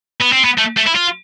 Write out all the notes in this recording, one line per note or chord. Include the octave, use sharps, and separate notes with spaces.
B3
C4
B3
A3
A3
E4
F4